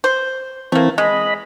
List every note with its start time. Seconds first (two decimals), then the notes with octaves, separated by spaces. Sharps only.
0.04 C5
0.72 E3 A3 A#3 C4
0.98 G#3 D#5 B5